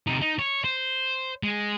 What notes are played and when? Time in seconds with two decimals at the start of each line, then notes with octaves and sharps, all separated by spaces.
0.07 C3 D#4
0.21 D#4
0.39 C#5
0.64 C5
1.43 G#3